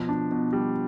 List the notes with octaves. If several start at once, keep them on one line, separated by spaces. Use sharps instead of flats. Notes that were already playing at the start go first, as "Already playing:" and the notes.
Already playing: B2 F3
D4
B2
G3